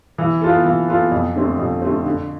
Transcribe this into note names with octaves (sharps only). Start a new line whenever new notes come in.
E3
B3 F4 A4
E3
B3 F4 A4
F2
D3 A3 C4
F2
D3 A3 C4
D3